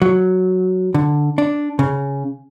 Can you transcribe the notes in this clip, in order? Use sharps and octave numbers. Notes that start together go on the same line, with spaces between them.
F#3
D3
D4
C#3